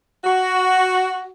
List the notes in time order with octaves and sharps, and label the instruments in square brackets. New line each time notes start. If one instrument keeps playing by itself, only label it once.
[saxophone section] F#4